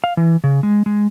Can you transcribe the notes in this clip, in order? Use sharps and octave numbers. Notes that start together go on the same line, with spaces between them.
F5
E3
C#3
G#3
G#3